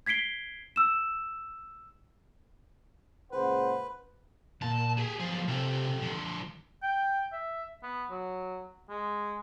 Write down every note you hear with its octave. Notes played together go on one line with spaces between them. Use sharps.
G#6 B6 C7 D7 G7
E6 E7
C#2 A#2 B4 C5 F#5
A#2 A5
G4 G#4
B1 F3 G#4
C3 F4 G4 A4
D3 F3
G5
E5
B3
F#3
G#3